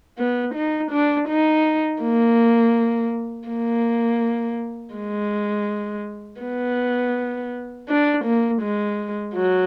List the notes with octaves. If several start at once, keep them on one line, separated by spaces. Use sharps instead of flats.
B3
D#4
D4
D#4
A#3
A#3
G#3
B3
D4
A#3
G#3
F#3